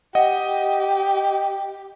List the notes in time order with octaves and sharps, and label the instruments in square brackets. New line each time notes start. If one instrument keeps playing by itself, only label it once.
[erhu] G4 [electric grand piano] D#5 [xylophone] F#5